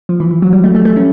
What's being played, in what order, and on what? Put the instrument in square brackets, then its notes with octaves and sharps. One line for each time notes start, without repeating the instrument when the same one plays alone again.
[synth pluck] F3
E3
E3
F#3
G3
A3
A3
A3
C#4